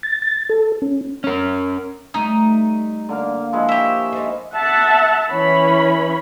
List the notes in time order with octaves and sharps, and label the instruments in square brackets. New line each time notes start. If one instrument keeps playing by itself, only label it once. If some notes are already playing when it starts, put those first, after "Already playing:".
[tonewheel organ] A6
A6
A4
C#4
[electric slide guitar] C#4 A#4
[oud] G3 A3 [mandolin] D#4
[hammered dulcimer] D3 A#3 F5
F3 G#3 E4
[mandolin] G4 E5 [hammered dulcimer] C#5
[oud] D#4 A4 C5 [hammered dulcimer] D#5
[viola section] E5 F#5 A5
E3 C#4 C#5 B5